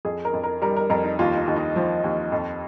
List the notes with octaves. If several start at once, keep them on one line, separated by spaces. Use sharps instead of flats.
F2 G#4
A#4
F2
A#4
G3 A#4
A#4
F2 A#4
D#4
D#2 F4
D#4
D#2
D#4
F3
D#2
F2